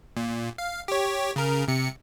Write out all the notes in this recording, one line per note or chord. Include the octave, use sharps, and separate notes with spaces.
A#2
F5
G4 C#5
C#3 A#4
C3 C#7